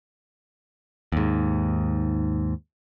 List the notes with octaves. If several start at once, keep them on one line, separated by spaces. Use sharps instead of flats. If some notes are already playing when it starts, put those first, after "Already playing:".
D#2 G#2